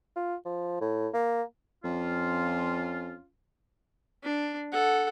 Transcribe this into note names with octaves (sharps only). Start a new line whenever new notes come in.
F4
F3
A2
A#3
F2 C#4 F4
D4
A4 F#5